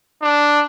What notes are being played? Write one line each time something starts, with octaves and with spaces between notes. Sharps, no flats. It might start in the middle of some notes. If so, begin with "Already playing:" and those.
D4